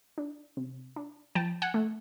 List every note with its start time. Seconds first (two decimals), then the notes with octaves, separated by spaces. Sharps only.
0.18 D4
0.57 C3
0.96 D4
1.35 F3 G5 A5
1.62 F#5 G#5
1.74 A3